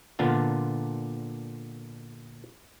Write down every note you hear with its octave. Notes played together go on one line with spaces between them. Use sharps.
A#2 D3 B3 D4 F4